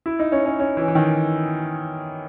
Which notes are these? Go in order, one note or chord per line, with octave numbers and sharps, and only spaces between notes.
E4
D#4
C#4
C#4
C#4
E3
E3
D#3